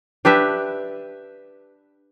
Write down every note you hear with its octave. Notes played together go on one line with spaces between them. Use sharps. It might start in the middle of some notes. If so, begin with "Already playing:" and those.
D4 G4 B4 E5